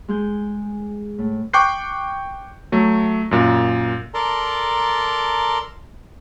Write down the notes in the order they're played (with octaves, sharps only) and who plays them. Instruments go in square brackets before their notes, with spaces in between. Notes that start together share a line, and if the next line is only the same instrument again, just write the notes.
[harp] G#3 G#4 G6
A2
[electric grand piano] G5 C#6 D6 F#6 G6 C7
F#3 A3
F#2 A#2
[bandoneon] A4 A#4 D5 A5 A#5 C6